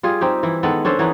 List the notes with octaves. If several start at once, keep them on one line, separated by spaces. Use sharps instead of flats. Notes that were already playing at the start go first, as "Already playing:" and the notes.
G3 F4 G#4
C4 D#4 G4
E3 E4
D#3 G#3 B3 A4
C#4 D4 A4 C5
E3 B3 D#4 C#5